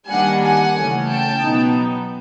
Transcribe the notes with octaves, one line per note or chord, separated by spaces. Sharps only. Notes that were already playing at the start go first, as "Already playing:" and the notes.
D#3 G3 A#3 D4 F#5 G#5
F#5 G#5
C#3 E3 A3 C#4
G5 A5
B2 F#3 B3 D#4